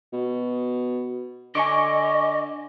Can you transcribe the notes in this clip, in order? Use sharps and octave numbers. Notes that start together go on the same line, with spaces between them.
B2
D3 D#5 G#5 C#6 D6